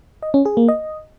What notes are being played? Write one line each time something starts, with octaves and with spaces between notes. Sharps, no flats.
D#5
C#4
G#4
A#3
D#5